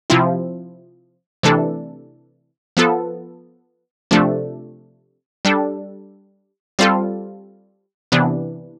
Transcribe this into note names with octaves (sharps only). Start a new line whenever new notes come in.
C3 F3 C4 E4
C3 E3 A3 D4 A4
F3 B3 F4 A4
C3 F3 A3 D4 A4
G3 D4 A4
G3 C4 F4 A4
C3 E3 B3 D4